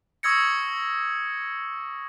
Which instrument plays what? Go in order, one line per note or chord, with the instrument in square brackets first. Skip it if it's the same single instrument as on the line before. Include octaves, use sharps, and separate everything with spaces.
[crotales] C#6 D#6 E6 G#6 A#6 C#7